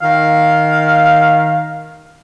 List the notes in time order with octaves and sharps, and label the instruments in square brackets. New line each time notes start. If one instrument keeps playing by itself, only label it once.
[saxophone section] D#3 F5